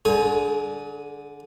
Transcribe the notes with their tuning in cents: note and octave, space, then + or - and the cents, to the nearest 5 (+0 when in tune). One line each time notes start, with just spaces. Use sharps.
D3 -5 G#4 +30 G#5 +0